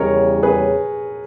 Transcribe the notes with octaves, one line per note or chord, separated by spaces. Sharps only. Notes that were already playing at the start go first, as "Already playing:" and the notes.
Already playing: E2 C#3 G3 C#4 A#4 C#5 D#5
G#4 B4